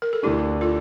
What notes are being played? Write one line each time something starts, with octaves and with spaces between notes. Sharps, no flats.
A#4
A4
D2 D3 A3 D4 E4 G4
F4 A4